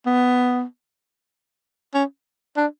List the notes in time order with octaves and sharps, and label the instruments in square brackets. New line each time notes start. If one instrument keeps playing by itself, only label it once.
[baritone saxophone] B3
C#4
D4